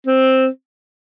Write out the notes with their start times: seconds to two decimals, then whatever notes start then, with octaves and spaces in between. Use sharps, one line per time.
0.07 C4